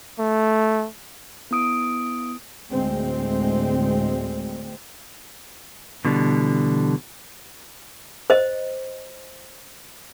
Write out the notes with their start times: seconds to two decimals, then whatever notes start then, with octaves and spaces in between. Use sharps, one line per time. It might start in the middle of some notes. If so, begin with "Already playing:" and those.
0.19 A3
1.51 B3 E4 D#6 D7
2.72 D2 A2 G#3 C4
6.05 B2 D3 E3 G3
8.30 C5 D#5